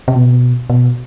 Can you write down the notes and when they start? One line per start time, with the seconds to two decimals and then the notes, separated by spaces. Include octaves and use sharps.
0.08 C3
0.15 B2
0.70 B2